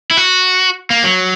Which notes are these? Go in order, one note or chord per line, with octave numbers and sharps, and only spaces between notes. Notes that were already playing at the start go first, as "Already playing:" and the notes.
E4
F#4
A#3
F#3